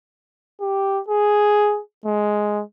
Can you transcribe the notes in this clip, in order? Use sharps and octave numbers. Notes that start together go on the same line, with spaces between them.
G4
G#4
G#3